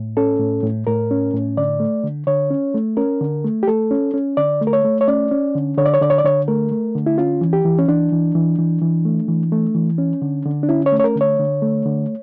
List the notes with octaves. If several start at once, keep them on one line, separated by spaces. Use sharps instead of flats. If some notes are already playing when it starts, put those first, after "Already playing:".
Already playing: A2
C#4 A4
A2
A2
A2 A#4
C#4
A2
D3 D5
A3
D3
D3 C#5
C#4
A3
C#4 A#4
D3
A3
G4
A3 A4
C#4
C#4
D3 D5
A3
A#4
C#5
A3
C#5
C#4 D5
C#4
D3
D3 C#5
D5
C#5
D3 D5
C#5
D5
D3 C#5
A3 A#4
A3
D3
E4
C#4 F4
E3
G4
E3
C#4
E3 D4
E3
E3
E3
E3
A3
E3
A3
E3
C#4
D3
D3
D4
C#4 E4
C#5
A3
C#5
A#4
D3
C#5
D3
A3
D3